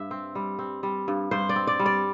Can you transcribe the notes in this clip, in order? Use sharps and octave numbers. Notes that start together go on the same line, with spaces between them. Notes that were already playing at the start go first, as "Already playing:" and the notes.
Already playing: G2 E5
C4
G3
C4
G3
G2
G2 C5
D5
C4
D5
G3
D5